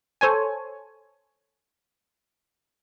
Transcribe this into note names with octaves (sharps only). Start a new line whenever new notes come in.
A4 C5 C#5 G#5